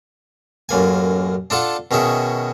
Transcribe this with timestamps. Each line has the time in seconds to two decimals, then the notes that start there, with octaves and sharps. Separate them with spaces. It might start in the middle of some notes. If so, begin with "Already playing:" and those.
0.69 A1 F#2 A#3 G#5
1.50 D4 F4 A4 F#5
1.91 B2 D#3 C#4 G#4 E5